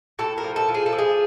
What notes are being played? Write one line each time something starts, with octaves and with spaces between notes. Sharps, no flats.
A2 A4
A#4
F3
A4
F3
G#4
A4
F3
G#4